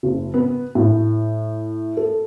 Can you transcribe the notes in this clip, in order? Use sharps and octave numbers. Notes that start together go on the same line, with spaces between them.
F#1
B3
A2
A4